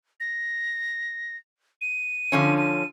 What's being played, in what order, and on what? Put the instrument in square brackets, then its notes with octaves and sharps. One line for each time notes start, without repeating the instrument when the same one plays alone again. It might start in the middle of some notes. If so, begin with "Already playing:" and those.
[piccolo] A#6
D#7
[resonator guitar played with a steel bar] D3 F3 C#4
[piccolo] D#7